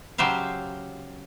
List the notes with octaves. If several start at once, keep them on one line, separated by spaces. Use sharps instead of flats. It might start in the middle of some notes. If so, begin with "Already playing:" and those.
C#3 F#3 G4 C5 E5 F5